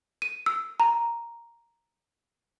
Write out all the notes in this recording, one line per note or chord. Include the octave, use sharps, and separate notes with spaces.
D#7
E6
A#5